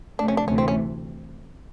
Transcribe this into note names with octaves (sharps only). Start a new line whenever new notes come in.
C3 F3 A3 D4
C#4
D4
D2 C3 E3 A3 C#4
C4
C#4